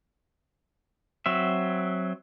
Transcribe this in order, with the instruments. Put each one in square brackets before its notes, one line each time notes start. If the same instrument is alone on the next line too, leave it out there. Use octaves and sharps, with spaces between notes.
[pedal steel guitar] F#3 C4 E5